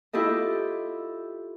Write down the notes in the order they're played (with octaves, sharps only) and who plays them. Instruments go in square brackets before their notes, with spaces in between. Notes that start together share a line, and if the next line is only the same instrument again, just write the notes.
[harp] E4 F4 G4 A4 D#5